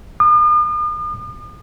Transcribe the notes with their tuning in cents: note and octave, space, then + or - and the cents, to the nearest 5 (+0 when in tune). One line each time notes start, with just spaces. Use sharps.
D#6 -45